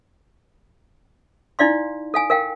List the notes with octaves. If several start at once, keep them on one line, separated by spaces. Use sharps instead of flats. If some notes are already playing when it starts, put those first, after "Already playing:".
D#4 E4 D5 F5 C6
A4 F5 G#5
A#4 F5 G5